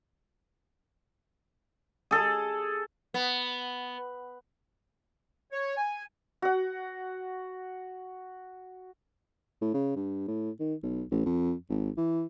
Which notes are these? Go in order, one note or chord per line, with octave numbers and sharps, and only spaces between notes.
G#4 A4
B3
C#5
G#5
F#4 F#5
A2
C#3
G2
A2
D#3
B1
A1
F2
G#1
E3